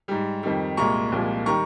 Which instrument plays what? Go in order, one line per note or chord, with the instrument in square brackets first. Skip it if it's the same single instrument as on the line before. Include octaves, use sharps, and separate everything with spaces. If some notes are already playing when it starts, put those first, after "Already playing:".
[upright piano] G#2 G3
F2 D#3 G3
C2 A#2 G#3 A#5 C#6
C2 A#2 F3 G#3
D#3 G3 A#5 C#6